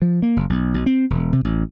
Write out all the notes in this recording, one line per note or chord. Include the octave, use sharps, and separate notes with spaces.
F3
A#3
F#1
B1
B1
C4
E1
C3
A1